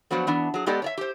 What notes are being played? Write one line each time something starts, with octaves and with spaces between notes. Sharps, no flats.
F3 F#3 B3 D4 F#4 C5
E3 B3 D4
F#3 G#4
G#3 B3 G4 A4 D5 D#5
C#5 D5 E5
G4 C5